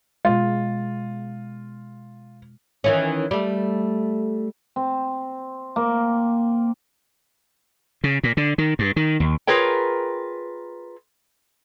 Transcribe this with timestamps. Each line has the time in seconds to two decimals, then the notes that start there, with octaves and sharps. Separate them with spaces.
0.25 B2 G#3 F4
2.84 D#3 E3 C#4
3.31 G3 A3
4.76 C4
5.76 A#3
8.04 C#3
8.24 A#2
8.37 D3
8.58 D#3
8.79 G2
8.96 D#3
9.20 D#2
9.47 F4 G#4 A#4 B4 C#5 G5